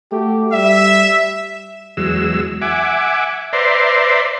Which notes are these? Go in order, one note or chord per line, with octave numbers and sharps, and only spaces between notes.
A3 F#4 G4
G3 E5
E2 F#3 G#3 E6
E5 F#5 G#5 D6
B4 C5 D5 E5 A#5 C6